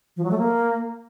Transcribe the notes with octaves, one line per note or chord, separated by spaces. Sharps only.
F3
F#3
A3
A#3